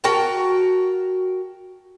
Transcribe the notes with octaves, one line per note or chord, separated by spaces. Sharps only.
F#4 A#4 G5 A5